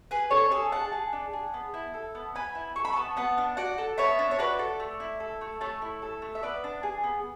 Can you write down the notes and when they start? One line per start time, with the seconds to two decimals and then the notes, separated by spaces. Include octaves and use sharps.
0.11 G#4 B4
0.31 D4 A4 C#5
0.51 G#4 A4 C#5
0.72 D4 F#5 A5
0.92 G#4
1.13 D4
1.33 G#4
1.54 B3
1.74 E4
1.94 A4
2.15 B3
2.35 B3 G#5 B5
2.55 E4
2.76 A4 C#6
2.85 B5
2.93 B3 A5 C#6
3.17 B3 F#5 A5
3.38 D4
3.57 F#4 D5 F#5
3.78 A4
3.98 B3 C#5 E5
4.19 D4
4.31 C#5
4.39 F#4 B4 D5
4.59 A4
4.80 A3
5.00 E4
5.20 A4
5.41 A3
5.61 A3 A4 C#5
5.82 E4
6.02 A4
6.22 A3
6.35 E5
6.43 B3 B4 D5
6.64 D4
6.83 G#4
7.04 B3